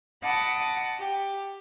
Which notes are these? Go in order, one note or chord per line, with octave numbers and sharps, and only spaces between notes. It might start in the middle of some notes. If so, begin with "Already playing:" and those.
D#5 F#5 A5 B5 D6
G4